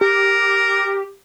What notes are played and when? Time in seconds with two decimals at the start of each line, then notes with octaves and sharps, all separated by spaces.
0.01 G4 A#4